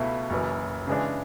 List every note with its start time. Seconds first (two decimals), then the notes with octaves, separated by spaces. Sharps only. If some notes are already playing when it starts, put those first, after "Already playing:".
Already playing: C#2 B2 A3 E4
0.30 F#1 F#2 E3
0.87 C#3 E3 G#3 D4